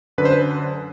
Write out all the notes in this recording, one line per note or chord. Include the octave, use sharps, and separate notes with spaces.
F#2 D3 B4
C5
B4